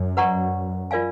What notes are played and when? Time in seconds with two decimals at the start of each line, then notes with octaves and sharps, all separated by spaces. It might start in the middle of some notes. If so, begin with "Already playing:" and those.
Already playing: F#2
0.17 B4 D5 F#5 A#5 C#6
0.91 F4 A#4 D5 F5 G#5